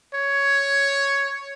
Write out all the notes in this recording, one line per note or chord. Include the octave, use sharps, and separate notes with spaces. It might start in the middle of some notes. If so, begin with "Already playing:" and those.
C#5